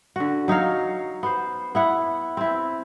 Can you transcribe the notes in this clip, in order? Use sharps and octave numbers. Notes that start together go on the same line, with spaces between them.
D3 F#4
F#3 D#4 C#5 F5
B3 C5
B3 E4 F#5
C4 E4